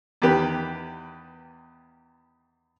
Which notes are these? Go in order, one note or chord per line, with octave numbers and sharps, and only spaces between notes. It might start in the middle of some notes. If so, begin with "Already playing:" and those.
E2 D#3 G4 B4